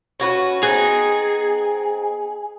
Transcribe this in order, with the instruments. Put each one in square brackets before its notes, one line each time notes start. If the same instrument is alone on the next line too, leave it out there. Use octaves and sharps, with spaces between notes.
[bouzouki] C#4 F#4 B4
[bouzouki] B3 C4 D#4 [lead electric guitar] G#4